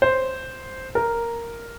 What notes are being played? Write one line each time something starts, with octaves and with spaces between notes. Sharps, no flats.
C5
A#4